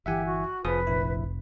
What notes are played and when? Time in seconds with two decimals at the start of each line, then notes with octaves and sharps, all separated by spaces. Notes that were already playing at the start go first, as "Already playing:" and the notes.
0.06 G1 E3 G4 E5 F#5 G#5
0.25 F#4
0.65 F1 F3 G#4 B4 D#6
0.87 A#1 E4